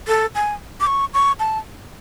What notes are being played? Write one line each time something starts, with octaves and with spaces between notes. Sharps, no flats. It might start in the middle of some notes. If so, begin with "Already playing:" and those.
A4
G#5
D6
C#6
C#6
A5